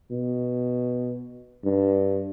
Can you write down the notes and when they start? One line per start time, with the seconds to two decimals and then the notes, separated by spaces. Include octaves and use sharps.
0.11 B2
1.65 G2